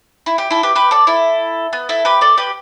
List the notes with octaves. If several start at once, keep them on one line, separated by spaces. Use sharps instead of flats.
E4
G4
E4 A4
G4 B4
G4 B4
A4 D5
E4 A4
B3
E4 A4
G4 B4
A4 D5
G4 B4